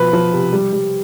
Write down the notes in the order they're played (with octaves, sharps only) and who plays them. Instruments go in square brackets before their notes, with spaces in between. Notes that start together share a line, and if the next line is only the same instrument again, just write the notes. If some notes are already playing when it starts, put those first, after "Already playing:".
Already playing: [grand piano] B2 F3 B4
F3
C3
G3
G3